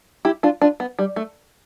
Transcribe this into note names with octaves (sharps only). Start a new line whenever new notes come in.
E4 G4
D4 F4
D4 F4
B3
G3
A3